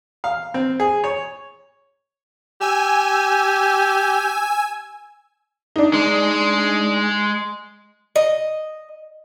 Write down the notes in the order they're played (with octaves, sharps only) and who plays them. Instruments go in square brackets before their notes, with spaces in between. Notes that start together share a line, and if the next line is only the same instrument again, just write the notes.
[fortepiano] F5
C4
G#4
C#5
[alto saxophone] G4 [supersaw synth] G#5 E6
[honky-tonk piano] D4 D#4
[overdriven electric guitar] G#3
[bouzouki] D#5